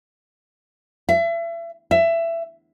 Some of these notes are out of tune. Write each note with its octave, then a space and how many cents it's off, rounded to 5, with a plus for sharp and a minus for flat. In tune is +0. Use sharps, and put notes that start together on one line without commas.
E5 +35
E5 +20